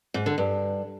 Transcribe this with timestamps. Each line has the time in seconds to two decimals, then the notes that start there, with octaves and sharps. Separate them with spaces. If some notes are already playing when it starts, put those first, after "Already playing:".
0.14 G#2
0.26 D3
0.38 G2